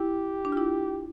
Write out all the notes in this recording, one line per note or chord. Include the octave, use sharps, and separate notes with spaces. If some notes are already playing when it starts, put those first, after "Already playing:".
Already playing: E4 G4
D4
F4
E4